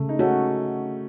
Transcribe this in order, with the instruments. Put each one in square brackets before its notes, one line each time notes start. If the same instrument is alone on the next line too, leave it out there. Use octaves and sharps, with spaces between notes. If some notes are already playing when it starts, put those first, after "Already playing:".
Already playing: [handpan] C#3 [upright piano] A3
[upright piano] D#4
[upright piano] A3 C#4 [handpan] F#4